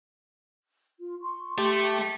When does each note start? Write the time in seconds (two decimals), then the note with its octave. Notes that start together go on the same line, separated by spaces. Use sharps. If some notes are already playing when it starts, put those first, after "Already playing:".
1.00 F4
1.21 C6 C#6
1.58 A3 G4
1.80 G5